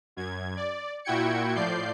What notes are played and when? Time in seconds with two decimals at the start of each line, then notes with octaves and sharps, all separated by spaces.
0.16 F#2 G#6
0.57 D5
1.04 A#2 E4 F#4 G5 G#6 C#7
1.55 A2 F3 D5 G6 C7